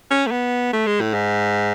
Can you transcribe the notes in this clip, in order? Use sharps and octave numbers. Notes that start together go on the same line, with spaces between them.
C#4
A3
B3
A3
G#3
A2
G#2